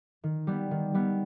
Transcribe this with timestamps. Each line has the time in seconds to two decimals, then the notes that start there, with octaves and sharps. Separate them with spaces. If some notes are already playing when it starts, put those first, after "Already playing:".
0.24 D#3
0.47 G3 B3
0.71 D#3
0.94 G3 B3